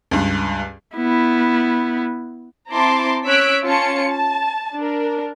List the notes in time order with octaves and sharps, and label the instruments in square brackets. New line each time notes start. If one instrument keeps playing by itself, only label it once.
[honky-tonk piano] C#2 G2
[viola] B3 E4
[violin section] C4 E4 A5 A#5 C6 D6
C#4 C#5 E6 F#6 B6 D7
C#4 F4 A5 C#7
A5
D4 A#4